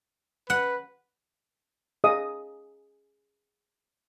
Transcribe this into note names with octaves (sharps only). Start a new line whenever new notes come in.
B4 F#5
G#4 D#5 F5 D#6